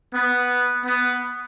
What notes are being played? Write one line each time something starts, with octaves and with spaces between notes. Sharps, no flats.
B3
B3